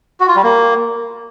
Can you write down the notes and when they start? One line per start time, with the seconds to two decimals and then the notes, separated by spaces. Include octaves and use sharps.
0.20 F#4
0.28 F4
0.36 G3
0.44 A#3